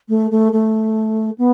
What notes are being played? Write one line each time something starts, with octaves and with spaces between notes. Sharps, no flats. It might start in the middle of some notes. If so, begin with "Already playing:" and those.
A3
A3
A3
B3